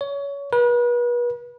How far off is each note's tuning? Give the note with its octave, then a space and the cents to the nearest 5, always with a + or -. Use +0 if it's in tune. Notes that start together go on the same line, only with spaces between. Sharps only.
C#5 +25
B4 -35